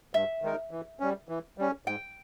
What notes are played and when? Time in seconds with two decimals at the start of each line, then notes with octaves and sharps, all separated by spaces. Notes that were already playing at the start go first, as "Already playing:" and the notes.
0.14 G2 E5
0.42 D#3 G#3 D#4 A#4
0.71 E3
1.00 G3 C#4
1.29 E3
1.58 G3 C#4
1.86 G#2 G5